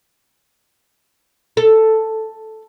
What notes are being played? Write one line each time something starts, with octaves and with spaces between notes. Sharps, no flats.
A4